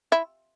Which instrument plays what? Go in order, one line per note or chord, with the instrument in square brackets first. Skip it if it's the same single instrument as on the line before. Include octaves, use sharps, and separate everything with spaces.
[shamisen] E4